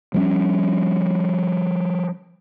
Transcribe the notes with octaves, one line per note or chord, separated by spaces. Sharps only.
F3 G3 C#4